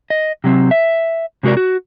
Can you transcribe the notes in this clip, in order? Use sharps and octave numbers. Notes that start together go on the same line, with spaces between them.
D#5
C3 F#3 C4
E5
C3 G#3 F#4 A#4 D5
F#4